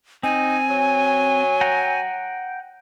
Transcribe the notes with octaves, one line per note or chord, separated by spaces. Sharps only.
C4 D#4 G#5
F#3
F#5 G5 A#5